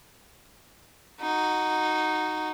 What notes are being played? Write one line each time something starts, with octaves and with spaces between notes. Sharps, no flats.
D#4 F#4